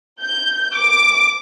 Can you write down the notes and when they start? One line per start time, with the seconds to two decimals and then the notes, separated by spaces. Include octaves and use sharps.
0.22 G6
0.74 D6